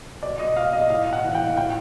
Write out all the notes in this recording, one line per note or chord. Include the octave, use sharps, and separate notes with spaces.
B2 D5
D#5
F5
D#5
A2 F5
F#5
E3
G5
A2 G5